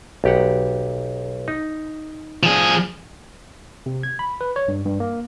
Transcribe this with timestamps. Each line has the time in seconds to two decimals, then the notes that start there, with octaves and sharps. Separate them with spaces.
0.24 B1 G4 F#5
1.48 D#4
2.43 F3 G#4
3.86 C3
4.03 G#6
4.19 B5
4.41 B4
4.56 C#5
4.68 G2
4.85 G2
5.00 A#3